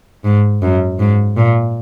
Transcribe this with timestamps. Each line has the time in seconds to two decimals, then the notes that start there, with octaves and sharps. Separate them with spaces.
0.24 G#2
0.62 F#2
0.99 G#2
1.37 A#2